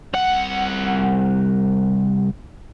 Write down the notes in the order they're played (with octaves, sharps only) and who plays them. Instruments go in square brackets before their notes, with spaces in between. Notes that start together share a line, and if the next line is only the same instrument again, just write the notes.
[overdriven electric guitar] C2 F#5